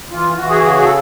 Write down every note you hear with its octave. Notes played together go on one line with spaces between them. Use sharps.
E3 F4
E3 F#4
F#4 G#4
C#3 F#4 G#4
F#4 G#4
A4